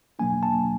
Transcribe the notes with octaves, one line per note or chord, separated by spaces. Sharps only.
B2 F#3 A#3 D4 G#5
A5